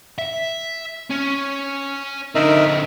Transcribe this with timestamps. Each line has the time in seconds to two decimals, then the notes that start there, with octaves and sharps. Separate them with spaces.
0.19 E5
1.10 C#4
2.35 D3 C4 D#4 A#4 E5